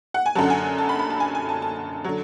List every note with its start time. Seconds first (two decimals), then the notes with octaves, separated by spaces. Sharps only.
0.14 F#5
0.26 G#5
0.35 F#2 D3 F#3 A5
0.43 F#5
0.50 G#5
0.78 A5
0.89 B5
0.99 B5
1.10 A5
1.20 G#5
1.35 G#5
1.49 A5
1.62 A5
2.04 D3 F#3